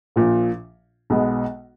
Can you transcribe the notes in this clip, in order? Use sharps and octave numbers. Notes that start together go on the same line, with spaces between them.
A#1 A#2 F3
B1 B2 G#3 B3